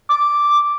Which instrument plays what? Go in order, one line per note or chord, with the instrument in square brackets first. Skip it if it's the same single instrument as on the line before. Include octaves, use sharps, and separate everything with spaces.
[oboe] D6